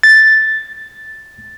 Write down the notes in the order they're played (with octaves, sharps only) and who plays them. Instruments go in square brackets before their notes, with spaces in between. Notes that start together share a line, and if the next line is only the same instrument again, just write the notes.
[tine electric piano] A6